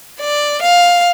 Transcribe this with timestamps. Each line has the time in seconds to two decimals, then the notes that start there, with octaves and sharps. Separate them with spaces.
0.21 D5
0.62 F5